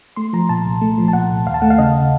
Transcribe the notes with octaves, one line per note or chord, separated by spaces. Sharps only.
A3 C6
F3 A#5
A#2 A5
C2
A3
F3
A5
A#2 F#5
C2
D#2 F5
A5
A3 F#5
F5
C#3 D#5